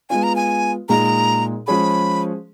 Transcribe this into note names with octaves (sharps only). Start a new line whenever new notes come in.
G#3 B3 F4 G#5
A#5
G#5
A#2 G#3 D#4 G#4 A#5
F3 G#3 C#4 G#4 B5